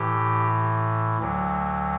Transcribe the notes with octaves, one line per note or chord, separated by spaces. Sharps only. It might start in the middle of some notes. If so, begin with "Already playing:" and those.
Already playing: A2 E3 G4
D2 D3 F#3